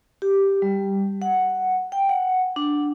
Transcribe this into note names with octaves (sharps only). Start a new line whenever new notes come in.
G4
G3
F#5
G5
F#5
D4